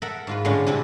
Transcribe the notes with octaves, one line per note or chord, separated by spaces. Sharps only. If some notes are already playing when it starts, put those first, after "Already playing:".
A4 A#4 E5 F#5
G#2 F4 B4
A2 D3 G#3 C#4 D4
C3 C4 D4 E4 G4